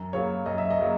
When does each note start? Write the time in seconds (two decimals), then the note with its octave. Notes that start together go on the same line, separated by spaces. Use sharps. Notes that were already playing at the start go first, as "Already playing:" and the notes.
Already playing: F#2
0.13 C#3 F#3 A#3 C#5
0.46 F#2 D#5
0.58 E5
0.70 D#5
0.78 C#3 F#3 A#3